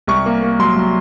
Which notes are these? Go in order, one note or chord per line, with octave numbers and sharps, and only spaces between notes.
C2 C#6
A#3
A#3
F#3 C6
F#3